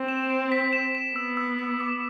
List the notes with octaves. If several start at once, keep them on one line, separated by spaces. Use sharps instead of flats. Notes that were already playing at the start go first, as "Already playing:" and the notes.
Already playing: C4
E7
D7
B6
E7
E7
B3 E6
E6
B6
D6